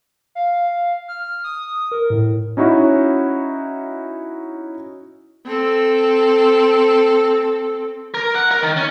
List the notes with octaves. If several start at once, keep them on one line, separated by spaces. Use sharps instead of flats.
F5
F6
D#6
A#4
A2
C#4 D#4 E4 F#4 C#5
C4 A4
A#4
F#5
A#4
D#3
C#4